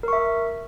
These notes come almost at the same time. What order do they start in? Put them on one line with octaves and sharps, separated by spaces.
A#4 C#6 E5